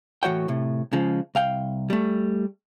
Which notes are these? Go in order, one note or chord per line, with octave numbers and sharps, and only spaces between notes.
A2 E3 F#4 C#5 F#5 G5
A2 C3
C#3 F3 G#3
C2 F5 G5
G3 A3